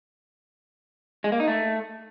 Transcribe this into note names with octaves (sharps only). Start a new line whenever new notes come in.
G#3
A#3
D#4
A3